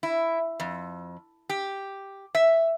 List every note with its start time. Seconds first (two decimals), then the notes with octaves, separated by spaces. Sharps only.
0.03 E4
0.60 F2
1.49 G4
2.35 E5